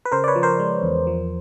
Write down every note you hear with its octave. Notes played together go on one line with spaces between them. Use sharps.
B4
C#3 A#4 C5
D5
B4 C#5
F3
A#4 C5
G#3
E2
F3